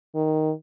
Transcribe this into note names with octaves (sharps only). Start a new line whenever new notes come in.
D#3